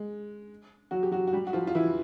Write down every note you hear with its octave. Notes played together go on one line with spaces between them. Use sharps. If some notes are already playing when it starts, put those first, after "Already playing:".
Already playing: G#3
F#3 F#4
G4
F#3 F#4
F#4
G3 G4
F#4
F3 F4
F4
E3 E4